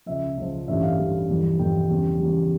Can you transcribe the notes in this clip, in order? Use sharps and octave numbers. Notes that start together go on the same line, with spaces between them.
C#2 C#3 F3 E5
C#2 C#3 F3
A1 G2 E3 G3 E5
F5
A1 G2 E3 G3
G1 F2 E3 G3
G1 F2 E3 G3 G5
E2 C#3 G3
E2 C#3 G3